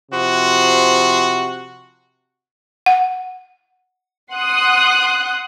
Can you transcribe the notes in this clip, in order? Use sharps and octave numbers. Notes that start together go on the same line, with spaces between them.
C3 F3 F#4
F#5
F#5 C6 D#6 F#6